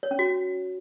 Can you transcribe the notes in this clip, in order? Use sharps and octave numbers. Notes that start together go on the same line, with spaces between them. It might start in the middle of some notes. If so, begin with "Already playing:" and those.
C#5
C#4
F#4